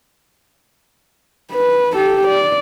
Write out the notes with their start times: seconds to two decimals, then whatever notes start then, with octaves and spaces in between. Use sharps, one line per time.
1.52 B4
1.94 G4 A4
2.28 D5